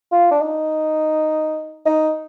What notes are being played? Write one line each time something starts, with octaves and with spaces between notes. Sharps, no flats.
F4
D4
D#4
D#4